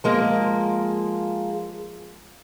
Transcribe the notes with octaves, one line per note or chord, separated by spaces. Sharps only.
F3 G#3 A#3